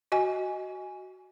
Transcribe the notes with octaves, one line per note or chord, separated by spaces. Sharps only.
F#4 D#5 G#5